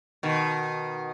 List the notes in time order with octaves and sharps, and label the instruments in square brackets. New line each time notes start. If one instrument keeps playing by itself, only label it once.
[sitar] B2 D#3